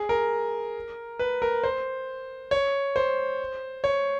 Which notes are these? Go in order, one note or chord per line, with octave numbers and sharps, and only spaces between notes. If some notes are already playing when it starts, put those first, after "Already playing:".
Already playing: G#4
A#4
B4
A#4
C5
C#5
C5
C#5